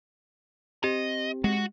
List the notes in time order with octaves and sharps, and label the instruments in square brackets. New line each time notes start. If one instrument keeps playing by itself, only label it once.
[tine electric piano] C4 [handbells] G4 [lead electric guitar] D#5
[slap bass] G#3 [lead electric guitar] F#4